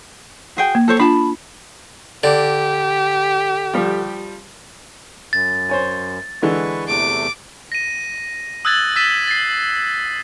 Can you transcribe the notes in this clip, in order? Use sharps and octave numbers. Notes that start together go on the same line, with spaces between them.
F#4 G#4 G5
A#3
A4 C5 C#5
D4 F4 A5 B5
D3 G4 D5
F3 G3
F#2 A6
C5 C#5 G#5
D3 E3 G#3 B4 C#6
E2 C3 A3 D6
A#6 D#7
D#6 E6 F#6 G#6 A6 F#7
E6 A6 B6 D#7 E7
A6 C7